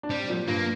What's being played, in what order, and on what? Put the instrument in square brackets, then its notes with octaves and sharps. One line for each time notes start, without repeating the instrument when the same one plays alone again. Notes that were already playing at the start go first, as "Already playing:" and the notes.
[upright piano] D4
[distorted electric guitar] G3 [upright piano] C4
[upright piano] A#2
[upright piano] G2 [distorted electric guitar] A#3